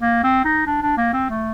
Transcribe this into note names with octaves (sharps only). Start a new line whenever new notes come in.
A#3
C4
D#4
D4
D4
A#3
C4
A3